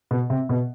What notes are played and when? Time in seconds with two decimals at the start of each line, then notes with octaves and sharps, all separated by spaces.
0.11 B2 B3
0.30 C3 C4
0.49 B2 B3